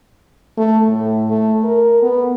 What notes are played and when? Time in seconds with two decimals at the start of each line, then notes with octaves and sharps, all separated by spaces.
0.57 A3
0.89 A2
1.30 A3
1.64 A#4
2.02 B3